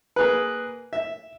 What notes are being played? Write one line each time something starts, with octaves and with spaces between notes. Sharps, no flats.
A#3 G#4 B4
E5